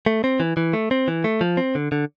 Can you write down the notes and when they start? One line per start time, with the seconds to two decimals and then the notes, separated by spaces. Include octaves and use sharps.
0.06 A3
0.24 C4
0.40 E3
0.57 E3
0.73 A3
0.91 C4
1.08 E3
1.24 A3
1.41 F3
1.57 C4
1.75 D3
1.92 D3